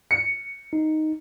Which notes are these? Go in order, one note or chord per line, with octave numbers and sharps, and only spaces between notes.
C#7
D#4